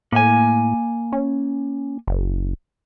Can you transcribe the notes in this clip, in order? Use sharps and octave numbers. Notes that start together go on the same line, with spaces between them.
A2 A#3 G#5
C#4
F#1